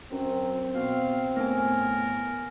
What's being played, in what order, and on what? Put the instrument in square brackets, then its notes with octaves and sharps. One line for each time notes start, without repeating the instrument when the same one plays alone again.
[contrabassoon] F#2 [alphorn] C4
[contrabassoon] B2 [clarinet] F5
[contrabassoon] A2 [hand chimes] B3 G#5 [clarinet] A#4